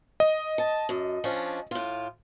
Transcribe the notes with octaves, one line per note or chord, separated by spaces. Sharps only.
D#5
A5
F#2
F3 C#4 D4
A2 F4